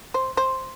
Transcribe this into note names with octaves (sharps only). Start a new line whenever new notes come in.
C5
C5